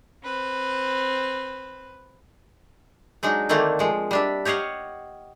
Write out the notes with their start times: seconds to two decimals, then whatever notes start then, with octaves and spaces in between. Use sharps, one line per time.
0.23 C4 B4
3.23 F#3 G#3 D4 D#4
3.49 D3 D#3 A3 A#3 C4 D4
3.79 F3 G#3
4.11 G3 D4 E5
4.45 G4 C#5 D#5 F5 F#5